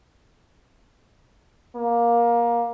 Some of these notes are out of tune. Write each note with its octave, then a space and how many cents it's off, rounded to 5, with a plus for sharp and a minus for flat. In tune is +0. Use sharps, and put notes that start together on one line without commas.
A#3 +15